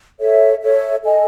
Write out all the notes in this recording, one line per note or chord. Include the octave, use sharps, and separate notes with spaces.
A4 C#5 E5
A4 C#5 E5
A4 D#5 G#5